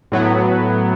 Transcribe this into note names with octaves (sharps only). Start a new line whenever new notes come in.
A2 F#3 B3